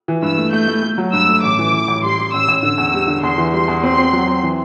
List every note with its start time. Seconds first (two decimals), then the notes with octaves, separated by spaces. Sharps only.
0.08 E3
0.22 G2 E6
0.38 A3
0.53 A3 G6
0.68 A3
0.83 A3
0.98 F#3
1.13 G2 E6
1.28 A3
1.43 A1 D6
1.59 E3
1.73 E3
1.88 A1
2.03 G3 C6
2.18 G3
2.33 A1 E6
2.48 A1
2.63 D3 E6
2.78 E2
2.94 G3
3.08 D3
3.23 E2 C6
3.38 E3
3.53 G3 C6
3.68 E2
3.83 C4 C6
3.98 C4
4.13 F#3
4.28 C4
4.43 E3